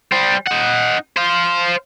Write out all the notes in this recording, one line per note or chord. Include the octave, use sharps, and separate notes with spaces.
G3 C5
D#4 F#5
C5 F5